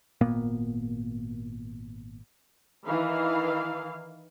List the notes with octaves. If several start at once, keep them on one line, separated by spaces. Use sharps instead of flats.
G#1 A#2 A#3 B3
D#3 E3 F5